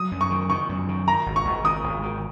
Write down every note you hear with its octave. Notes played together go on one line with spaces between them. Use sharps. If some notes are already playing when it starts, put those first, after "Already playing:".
Already playing: F#3 D#6
F#2
C#6
D#3
D#3 C#6
F#2
D#3
D#3 A#5
G#1
C#6
G#1
D#3 D#6
G#1
D#3